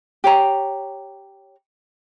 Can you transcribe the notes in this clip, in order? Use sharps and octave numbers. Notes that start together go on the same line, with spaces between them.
G4 C#5 A#5